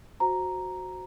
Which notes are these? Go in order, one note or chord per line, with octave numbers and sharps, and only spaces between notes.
F#4 C5 A#5